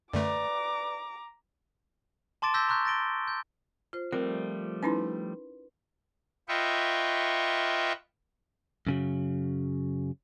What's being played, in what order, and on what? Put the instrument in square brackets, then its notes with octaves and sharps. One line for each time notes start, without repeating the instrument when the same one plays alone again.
[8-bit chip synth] F#2 D3 A3 [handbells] B4 D5 [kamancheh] A#5 D6
[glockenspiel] A5 C6 D6 A6 D7 E7
E6 G6 A#6 B6 G7
A#5 C6 C#6 F#6 G6 B6
A6 A#6 D7 G7
G6
[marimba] F4 C5
[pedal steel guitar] F3 G3 A3 [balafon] C4 [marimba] A#4
[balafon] C#4 D#4 E4 [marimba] B4 B5 C6
[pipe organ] F4 B4 D#5 E5 G5 C#6
[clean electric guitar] F#2 C#3 F#3